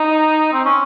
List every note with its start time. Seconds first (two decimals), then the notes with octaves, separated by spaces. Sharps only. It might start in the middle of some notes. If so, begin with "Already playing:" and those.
Already playing: D#4
0.53 C4
0.65 C#4